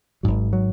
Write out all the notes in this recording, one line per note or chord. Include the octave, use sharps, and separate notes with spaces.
G#1 G#2 F#3
F#3